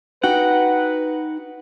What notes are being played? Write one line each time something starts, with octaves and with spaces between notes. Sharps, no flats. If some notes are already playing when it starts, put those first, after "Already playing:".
D#4 F#4 B4 F#5 G5